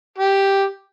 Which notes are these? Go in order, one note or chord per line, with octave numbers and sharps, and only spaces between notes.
G4